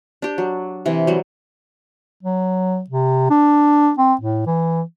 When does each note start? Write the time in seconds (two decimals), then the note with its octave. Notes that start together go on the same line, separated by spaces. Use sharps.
0.22 D4 G4
0.38 F#3
0.86 C3 E3
1.07 F#3 G3
2.23 F#3
2.90 C3
3.30 D4
3.98 C4
4.21 A2
4.46 E3